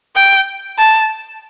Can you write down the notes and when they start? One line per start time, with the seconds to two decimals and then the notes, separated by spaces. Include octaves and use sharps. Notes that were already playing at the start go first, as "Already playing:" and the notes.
0.16 G5
0.79 A5